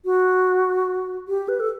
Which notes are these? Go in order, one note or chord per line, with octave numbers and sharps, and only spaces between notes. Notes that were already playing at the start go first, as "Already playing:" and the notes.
F#4
G4
B4
A4